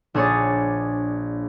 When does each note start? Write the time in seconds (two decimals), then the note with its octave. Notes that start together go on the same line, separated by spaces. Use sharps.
0.14 A#1 D4 G#4 C#5 C#6 A6